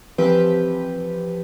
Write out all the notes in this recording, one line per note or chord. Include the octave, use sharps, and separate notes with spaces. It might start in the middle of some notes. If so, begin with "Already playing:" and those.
E3 F3 C4 G4 B4